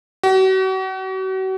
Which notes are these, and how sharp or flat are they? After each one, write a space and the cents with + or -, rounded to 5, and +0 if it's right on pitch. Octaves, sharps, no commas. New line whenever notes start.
F#4 +40